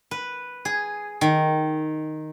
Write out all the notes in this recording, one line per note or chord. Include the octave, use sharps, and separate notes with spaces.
B4
G#4
D#3